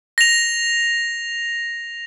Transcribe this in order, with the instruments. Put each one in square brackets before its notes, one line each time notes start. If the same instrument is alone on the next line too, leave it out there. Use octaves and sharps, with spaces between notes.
[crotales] A#6 F7